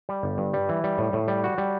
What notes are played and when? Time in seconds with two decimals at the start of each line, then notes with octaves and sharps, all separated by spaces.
0.09 G3
0.23 G1
0.38 G2
0.54 G3
0.69 E3
0.84 G3
0.98 A2
1.13 A2
1.28 G3
1.44 F#4
1.58 G3